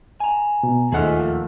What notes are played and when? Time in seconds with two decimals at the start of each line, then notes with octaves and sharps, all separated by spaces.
0.20 G#5 A#5
0.63 B2
0.92 D#2 A#2 A3 G#4 C5 D#5 F#5 F6
1.19 F3